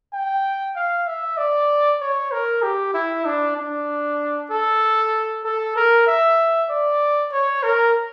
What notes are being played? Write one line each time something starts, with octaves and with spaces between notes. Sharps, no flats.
G5
F5
E5
D5
C#5
A#4
G4
E4
D4
D4
A4
A4
A#4
E5
D5
C#5
A#4